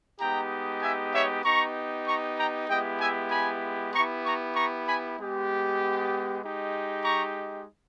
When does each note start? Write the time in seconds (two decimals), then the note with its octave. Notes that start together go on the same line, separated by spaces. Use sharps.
0.20 G#3 B3 D#4 G4 G5 A#5
0.82 E5 G#5
1.13 C#5 E5
1.44 B3 D#4 G4 A#5 C#6
2.07 A#5 C#6
2.37 G5 A#5
2.69 G#3 B3 E4 G4 D#5 G5
3.00 E5 G#5
3.31 G#5 B5
3.93 B3 E4 G4 A#5 C#6
4.24 A#5 C#6
4.55 A#5 C#6
4.87 G#5 B5
5.18 G#3 B3 G4
6.42 G#3 D#4 G4
7.04 A#5 C#6